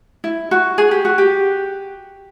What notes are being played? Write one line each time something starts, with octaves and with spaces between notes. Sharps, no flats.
E4
F#4
G#4
G4
F#4
G4